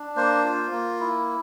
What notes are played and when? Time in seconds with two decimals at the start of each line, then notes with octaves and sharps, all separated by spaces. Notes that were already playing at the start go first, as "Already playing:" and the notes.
Already playing: D4
0.16 A#3 C5
0.44 F4
0.72 A#3
1.00 E4